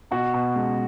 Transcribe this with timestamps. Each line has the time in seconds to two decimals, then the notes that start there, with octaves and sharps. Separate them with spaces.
0.11 B2 F#4
0.34 B2
0.55 C#2